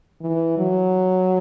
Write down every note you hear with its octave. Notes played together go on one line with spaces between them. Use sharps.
E3
F#3